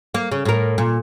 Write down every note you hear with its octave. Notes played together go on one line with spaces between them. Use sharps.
A#3
C#3
A2 A#4
A#2